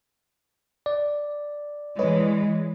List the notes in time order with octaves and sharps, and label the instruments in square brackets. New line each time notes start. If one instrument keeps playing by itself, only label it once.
[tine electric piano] D5
[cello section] E3 G#3 [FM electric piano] B4 C#5 D#5